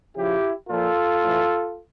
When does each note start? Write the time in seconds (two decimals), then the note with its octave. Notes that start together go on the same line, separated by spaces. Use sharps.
0.16 C#3 F3 E4 G4
0.69 A#2 F3 F4 A4
1.21 A2 E3